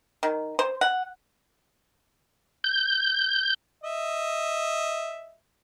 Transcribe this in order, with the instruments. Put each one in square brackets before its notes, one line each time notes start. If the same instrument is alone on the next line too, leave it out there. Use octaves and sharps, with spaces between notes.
[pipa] D#3
C5
F#5
[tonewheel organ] G6
[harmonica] D#5 E5